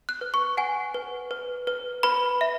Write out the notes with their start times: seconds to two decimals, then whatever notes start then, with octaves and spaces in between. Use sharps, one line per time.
0.09 F#6
0.21 B4
0.34 C#6
0.57 F#5 G#5
0.94 B4
1.31 B4
1.67 B4
2.03 B4 B5
2.41 E5